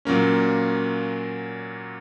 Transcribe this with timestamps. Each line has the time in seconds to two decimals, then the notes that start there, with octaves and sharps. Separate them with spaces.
0.05 A#2 F#3 A#3 C#4